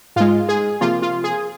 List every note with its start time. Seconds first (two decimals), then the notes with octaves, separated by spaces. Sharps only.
0.16 G#2 G#3 F4
0.49 G#4
0.81 C3 F3 A#3 F4
1.02 F4
1.24 G#4